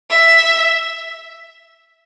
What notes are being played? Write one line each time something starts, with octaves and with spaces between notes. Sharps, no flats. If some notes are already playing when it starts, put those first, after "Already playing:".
E5